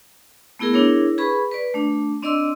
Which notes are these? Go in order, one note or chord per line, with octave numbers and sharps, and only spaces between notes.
A3 B3 E4 G#4 A#4
D4 E4 G#4 A#4 C#5
G#4 B4 B5 C#6
B4 D5
A3 D4
C4 D4 D5 D#5 C6 E6